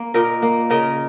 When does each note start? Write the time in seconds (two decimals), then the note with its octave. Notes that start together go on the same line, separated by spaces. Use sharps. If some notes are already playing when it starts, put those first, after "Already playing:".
Already playing: A#3
0.14 A#2 A#4 D#5
0.42 A#3
0.70 C#3 A#4 D#5